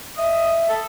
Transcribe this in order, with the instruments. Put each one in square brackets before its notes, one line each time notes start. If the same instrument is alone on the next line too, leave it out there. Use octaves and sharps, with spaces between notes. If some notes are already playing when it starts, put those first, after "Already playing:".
[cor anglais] D#5 [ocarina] E5
[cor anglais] A4